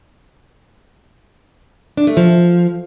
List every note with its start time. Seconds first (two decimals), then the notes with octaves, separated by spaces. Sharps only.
1.97 D4
2.07 A3
2.17 F3